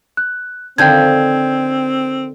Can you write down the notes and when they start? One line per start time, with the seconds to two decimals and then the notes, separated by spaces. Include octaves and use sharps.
0.17 F#6
0.78 D3 D#3 F3 C4 G5 G6 G#6